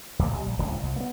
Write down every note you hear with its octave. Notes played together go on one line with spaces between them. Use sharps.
D2 A#2
B1 G3
A#1
D1 C#2 D3 F3
C2
A#3 B3